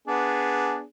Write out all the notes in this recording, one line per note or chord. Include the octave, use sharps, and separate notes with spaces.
B3 D4 G#4